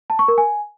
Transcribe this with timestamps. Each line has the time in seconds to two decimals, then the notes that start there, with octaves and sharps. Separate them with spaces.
0.10 A5
0.19 C#6
0.28 A#4
0.38 G#5